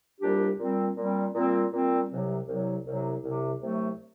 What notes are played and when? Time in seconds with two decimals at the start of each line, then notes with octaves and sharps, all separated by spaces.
0.21 C2 A#2 G3 D4 G4
0.59 A#2 G3 C4
0.97 A#2 G3 C4
1.34 A#2 G3 C4
1.72 A#2 G3 C4
2.09 C2 C3 F#3
2.47 C2 C3 F#3
2.86 C2 C3 F#3
3.23 C2 C3 F#3
3.61 C2 C3 F#3 A3